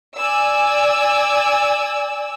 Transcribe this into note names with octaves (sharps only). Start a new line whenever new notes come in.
D5 G#5 E6